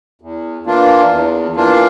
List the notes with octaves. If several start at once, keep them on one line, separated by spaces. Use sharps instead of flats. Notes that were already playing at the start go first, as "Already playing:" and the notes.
E2
E3 A#3 D4 F4
E2
E3 A#3 D4 F4